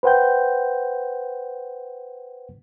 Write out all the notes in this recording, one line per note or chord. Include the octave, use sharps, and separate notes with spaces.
B4 C5 F#5 G5 G6